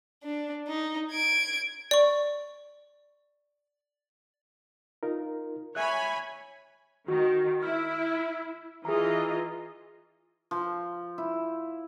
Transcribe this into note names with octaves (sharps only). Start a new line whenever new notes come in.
D4
D#4
G#6 D7
D5 C#6
D#4 F4 A#4
C#5 E5 G#5 B5 F#6
D#3 F#4
E4 F6
E3 F4 G#4 D#5 A#5
F3
E4